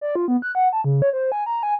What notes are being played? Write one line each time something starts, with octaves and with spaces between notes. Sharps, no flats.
D5
F4
B3
F#6
F#5
A5
C#3
C#5
C5
G#5
A#5
G#5